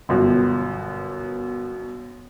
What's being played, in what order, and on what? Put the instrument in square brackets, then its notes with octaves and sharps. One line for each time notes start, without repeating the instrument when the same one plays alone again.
[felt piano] G1 F#2 B2